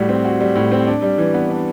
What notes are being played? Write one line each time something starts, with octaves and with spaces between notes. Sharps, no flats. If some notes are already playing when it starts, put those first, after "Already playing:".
Already playing: A2 G3 F#4
C4
F#4
G3
A2
C4
D4
G3
E3
B3
D4